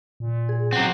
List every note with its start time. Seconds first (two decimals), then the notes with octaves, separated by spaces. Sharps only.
0.20 A#2
0.49 G#4
0.73 F#3 C4 F#5